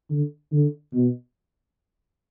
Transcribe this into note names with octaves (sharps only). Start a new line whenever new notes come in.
D3
D3
B2